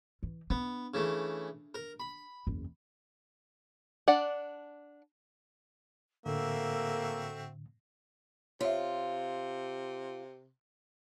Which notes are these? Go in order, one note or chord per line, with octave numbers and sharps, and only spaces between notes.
E3
B3 D4
C#3 E3 A3
A#4
B5
F#1 E2
D4 D5 F#5
A2 D3 A#3 C4 F#4 A4 E5
C3 F4 C#5 E5